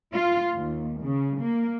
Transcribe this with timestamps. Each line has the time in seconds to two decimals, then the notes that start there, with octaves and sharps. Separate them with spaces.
0.14 F4
0.53 D#2
1.02 C#3
1.38 A#3